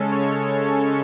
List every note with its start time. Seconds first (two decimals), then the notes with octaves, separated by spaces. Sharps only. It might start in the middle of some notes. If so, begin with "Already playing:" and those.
Already playing: C#3 G#3 C#4 A4
0.12 C#5